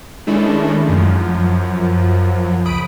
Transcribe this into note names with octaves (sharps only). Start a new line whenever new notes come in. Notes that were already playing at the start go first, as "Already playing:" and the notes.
D#3 G#3 A3 C#4 D4 E4
F#2 F3
C#2 B5 D#6 D7